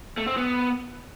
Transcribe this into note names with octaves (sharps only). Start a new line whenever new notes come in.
A3
C4
B3